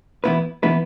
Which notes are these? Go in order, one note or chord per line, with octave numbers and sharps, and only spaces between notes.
E3 B3 E4 B4
E3 B3 E4 B4